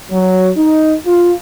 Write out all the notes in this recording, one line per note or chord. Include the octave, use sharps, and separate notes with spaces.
F#3
D#4
F4